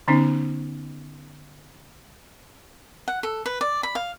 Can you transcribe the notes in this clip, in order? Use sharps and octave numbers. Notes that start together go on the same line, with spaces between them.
D3 B3 C#4 D#4
F#5
A4
B4
D5
B5
F5